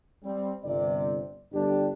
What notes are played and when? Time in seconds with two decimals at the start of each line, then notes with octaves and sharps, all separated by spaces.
0.23 G3 C4
0.64 G1 C3 D5
1.53 G1 D4 G4